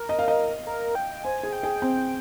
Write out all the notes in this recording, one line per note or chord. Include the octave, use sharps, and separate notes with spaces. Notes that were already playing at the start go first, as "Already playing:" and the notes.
Already playing: A#4
D#5
F5
D#5
A#4
G5
C5 G#5
G#4
G5
G#4
C4